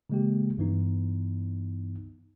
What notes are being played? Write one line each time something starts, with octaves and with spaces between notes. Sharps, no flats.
C#3 E3 G#3 A#3 G4
G2 E3 B3 D#4